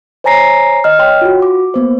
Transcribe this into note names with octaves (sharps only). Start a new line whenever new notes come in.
C5 C#5 G#5 A#5 A#6 C7
D#5 F6
C#5 G5 C6
F4 F#4
D6
A#3 B3 C5